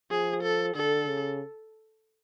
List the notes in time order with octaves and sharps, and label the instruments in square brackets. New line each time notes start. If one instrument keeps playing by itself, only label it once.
[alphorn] F3 [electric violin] G#4
[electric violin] A4
[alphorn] D3 [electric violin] A4
[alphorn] C#3